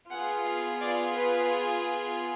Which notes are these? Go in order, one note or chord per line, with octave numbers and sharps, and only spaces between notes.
B3 F4 G#4 F#5
F5
D5
B4